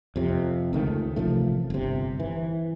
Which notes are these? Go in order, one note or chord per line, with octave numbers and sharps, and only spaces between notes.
F2 C3
C#2 D#3 A3
A1 C3 F3 A3
G1 C3
E3